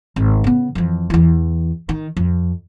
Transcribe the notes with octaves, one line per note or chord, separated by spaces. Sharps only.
G#1
C#3 B3
F2 E3
E2 E3
D#3
F2